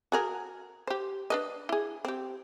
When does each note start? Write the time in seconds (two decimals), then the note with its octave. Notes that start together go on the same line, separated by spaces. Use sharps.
0.12 F#4 G#4 A#4
0.87 G4 C5
1.30 D4 B4 D#5
1.69 E4 G#4
2.05 C4 G4